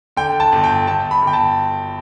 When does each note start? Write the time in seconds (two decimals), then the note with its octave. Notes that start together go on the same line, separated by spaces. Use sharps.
0.17 D3 G5
0.40 A5
0.52 G1
0.64 G5
0.87 G1 A5
1.11 B5
1.22 G1 G5
1.33 A5